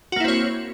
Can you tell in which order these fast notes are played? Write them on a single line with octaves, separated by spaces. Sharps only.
F#4 A#3 E4 C4 C#5